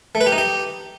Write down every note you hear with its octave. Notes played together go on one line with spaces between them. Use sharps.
A3
B4
G4
D#4
G4